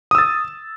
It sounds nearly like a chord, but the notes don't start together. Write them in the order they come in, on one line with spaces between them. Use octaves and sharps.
D#6 E6 A6